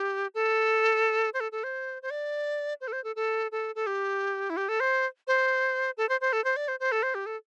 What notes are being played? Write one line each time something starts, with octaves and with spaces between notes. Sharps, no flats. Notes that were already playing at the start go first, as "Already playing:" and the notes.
Already playing: G4
A4
C5
A4
A4
C5
C5
D5
C5
A4
C5
A4
A4
A4
A4
G4
E4
G4
A4
C5
C5
A4
C5
C5
A4
C5
D5
C5
C5
A4
C5
G4
A4